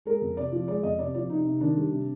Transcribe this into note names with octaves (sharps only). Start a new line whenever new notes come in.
G#3 A#4
F2
C3 D5
F3
G#3 D5
F2 D#5
C3 D5
F3 D5
C3 D#4
C3
D#3 D4
G3
C3